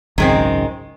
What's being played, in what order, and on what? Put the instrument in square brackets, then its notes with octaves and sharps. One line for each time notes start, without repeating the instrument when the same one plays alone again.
[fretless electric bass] G#1 C#2 F#2 [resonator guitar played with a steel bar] D#3 G#3 C4